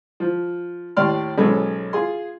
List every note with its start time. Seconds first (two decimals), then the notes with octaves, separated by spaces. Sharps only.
0.20 F3
0.97 D#2 A2 D5 C6 F6
1.38 B1 G#2 G#3 C#4 A4 B5
1.93 F4 G#4 C6